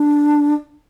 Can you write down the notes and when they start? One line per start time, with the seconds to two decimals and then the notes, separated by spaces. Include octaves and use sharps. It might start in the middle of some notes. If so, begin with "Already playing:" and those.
Already playing: D4